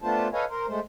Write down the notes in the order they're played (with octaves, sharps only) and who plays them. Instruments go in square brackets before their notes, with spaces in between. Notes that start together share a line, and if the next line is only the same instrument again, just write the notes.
[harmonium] A3 B3 D4 F4 C5 A5
A4 B4 C#5 D#5 F5 G#5
A#4 C5
G#3 A3 C5